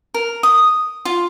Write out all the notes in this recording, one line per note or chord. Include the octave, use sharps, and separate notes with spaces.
A#4
D#6
F4